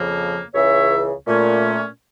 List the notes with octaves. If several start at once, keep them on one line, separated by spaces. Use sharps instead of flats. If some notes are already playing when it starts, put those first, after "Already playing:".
Already playing: F2 C#3 F3 A#3
C#2 C#3 E3 C#5 E5
A#2 A3 C#4